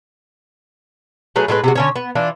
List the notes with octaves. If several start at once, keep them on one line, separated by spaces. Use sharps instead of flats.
F#3 A3 G#4 B4
A2 G#3 G4 B4
C3 G#3 F#4
D3 C#4 C#5
B3
E3 D4 F4